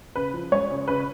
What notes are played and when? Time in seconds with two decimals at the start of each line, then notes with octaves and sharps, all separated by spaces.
0.16 C#3 B4
0.34 F3
0.52 G#3 C#5
0.71 C#3
0.88 C#3 B4